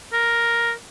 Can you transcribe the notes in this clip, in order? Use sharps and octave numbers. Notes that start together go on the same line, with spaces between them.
A#4